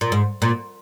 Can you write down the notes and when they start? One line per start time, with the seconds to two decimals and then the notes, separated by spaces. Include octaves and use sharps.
0.01 A#2
0.12 G#2
0.42 A#2